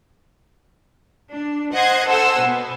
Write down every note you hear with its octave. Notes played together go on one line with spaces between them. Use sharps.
D4
C5 D#5 F#5 F#6 G#6
A4 C5 F#5 G#5 E6
B2 B3